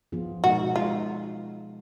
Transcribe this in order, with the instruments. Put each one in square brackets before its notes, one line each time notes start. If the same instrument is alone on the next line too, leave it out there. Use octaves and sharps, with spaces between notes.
[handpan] F3 B3 F4 G#4
[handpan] B2 G#3 D#4 A#4 [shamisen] F#4
[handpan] G#3 D#4 A#4 [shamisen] F4